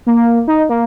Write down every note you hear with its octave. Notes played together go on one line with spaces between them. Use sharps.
A#3
D#4
A#3